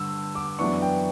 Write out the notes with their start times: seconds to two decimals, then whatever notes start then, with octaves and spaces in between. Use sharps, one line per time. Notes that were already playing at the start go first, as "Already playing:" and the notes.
Already playing: G2 D3 E6
0.35 D6
0.59 F#2 E3 B3 D4 C#6
0.82 G5